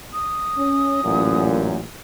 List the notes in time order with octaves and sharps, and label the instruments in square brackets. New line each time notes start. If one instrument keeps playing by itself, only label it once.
[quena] D#6
[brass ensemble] C#4
A1 F#2 A#2